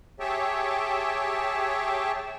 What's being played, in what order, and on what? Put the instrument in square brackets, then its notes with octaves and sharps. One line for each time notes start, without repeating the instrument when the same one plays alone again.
[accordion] G4 G#4 C#5 E5 G5 A5